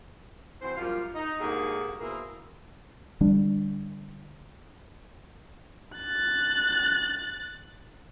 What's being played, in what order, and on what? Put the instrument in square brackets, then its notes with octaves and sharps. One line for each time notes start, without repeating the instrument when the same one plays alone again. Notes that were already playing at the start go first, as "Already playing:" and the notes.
[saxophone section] E3 C4 F#4 C5
F#2 F3 G3 A#3 F4
D#4
D#2 G#2 D3 A#3 F#4 G#4
B2 A#3 C4 E4 G#4 A#4
[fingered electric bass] D3 G3 D4
[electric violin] F#6 A6